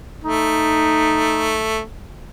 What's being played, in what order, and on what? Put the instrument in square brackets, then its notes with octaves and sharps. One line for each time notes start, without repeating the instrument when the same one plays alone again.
[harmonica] A3 [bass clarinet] D#4